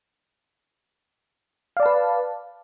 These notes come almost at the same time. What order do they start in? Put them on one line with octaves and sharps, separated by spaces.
F5 D5 A5 B4